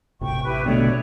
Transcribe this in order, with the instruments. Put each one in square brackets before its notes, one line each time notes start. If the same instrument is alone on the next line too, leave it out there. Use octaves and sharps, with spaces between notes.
[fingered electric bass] A1 A2 C3 [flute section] G5 C#6
[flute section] E4 G4 B4
[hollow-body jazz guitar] B2 D3 A3 [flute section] C#5 D5 E5